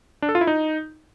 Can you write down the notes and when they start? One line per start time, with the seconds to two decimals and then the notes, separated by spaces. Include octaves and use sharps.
0.22 D4
0.29 A4
0.35 F4
0.41 E4
0.47 D#4